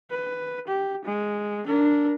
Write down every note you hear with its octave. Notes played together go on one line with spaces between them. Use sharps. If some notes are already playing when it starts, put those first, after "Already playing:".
B4
G4
G#3
D4 A#4